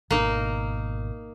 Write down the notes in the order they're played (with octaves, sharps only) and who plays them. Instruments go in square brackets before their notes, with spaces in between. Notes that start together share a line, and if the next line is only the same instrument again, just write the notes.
[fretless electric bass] G#1 B2 [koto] A#3 D#4